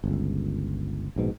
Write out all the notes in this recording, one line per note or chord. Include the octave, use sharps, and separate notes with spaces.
G1 C#2
A#1 G#2 B2